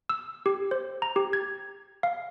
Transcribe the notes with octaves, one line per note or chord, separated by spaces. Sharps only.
E6
G4
C5
A#5
G4
G#6
F5